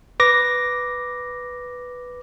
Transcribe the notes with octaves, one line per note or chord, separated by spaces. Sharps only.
B4 D6 A#6